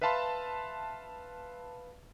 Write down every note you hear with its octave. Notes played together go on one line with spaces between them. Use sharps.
B4 E5 F5 A5 B5 C6